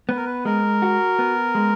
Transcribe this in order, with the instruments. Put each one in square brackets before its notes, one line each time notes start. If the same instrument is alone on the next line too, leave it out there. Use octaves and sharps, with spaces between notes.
[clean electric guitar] B3 [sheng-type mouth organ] B4
[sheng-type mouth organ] A#4
B4
[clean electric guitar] G#3 [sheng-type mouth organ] A#4
[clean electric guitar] F#4
B3
G#3